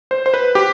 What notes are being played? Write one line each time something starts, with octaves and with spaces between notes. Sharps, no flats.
C5
C5
B4
G4